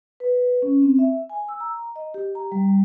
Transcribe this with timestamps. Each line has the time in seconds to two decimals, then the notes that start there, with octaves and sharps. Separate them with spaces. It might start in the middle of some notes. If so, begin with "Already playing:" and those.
0.20 B4
0.62 C#4
0.82 C4
0.99 E5
1.30 G#5
1.48 E6
1.60 A#5
1.96 D#5
2.14 G4
2.35 A#5
2.52 G3